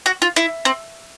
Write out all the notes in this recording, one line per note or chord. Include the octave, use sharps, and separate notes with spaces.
F#4
F4
E4
C4